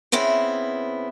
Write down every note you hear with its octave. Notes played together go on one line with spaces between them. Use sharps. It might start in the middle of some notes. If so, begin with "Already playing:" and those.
C#3 B3 C4 E4